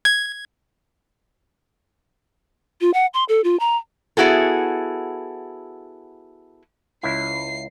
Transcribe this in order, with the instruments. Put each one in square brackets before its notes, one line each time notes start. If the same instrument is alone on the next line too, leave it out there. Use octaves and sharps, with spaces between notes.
[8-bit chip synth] G#6
[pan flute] F4
F#5
C6
A4
F4
A#5
[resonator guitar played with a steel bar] B3 E4 F#4 G#4 A4
[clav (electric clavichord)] C#2 E4 [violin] C7